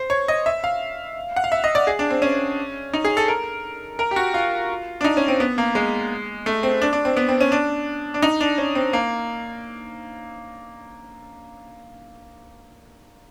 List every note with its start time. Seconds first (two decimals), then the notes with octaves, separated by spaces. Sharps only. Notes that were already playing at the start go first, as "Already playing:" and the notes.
Already playing: C5
0.10 C#5
0.28 D#5
0.46 E5
0.64 F5
1.36 F#5
1.44 F5
1.52 E5
1.64 D#5
1.75 D5
1.87 G#4
1.99 D4
2.10 C4
2.22 C#4
2.93 D#4
3.05 G#4
3.17 A4
3.28 A#4
3.99 A#4
4.11 G4
4.16 F#4
4.34 F4
5.01 D4
5.04 D#4
5.17 C#4
5.28 C4
5.40 B3
5.58 A#3
5.75 G#3
6.46 A3
6.63 C4
6.82 D4
6.93 D4
7.05 C4
7.17 B3
7.29 C4
7.41 C#4
7.52 D4
8.14 D4
8.22 D#4
8.41 D4
8.58 C#4
8.75 C4
8.93 A#3